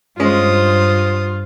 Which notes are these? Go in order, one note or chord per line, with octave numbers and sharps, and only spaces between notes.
G2 G#3 C#4 F4 C5 D#6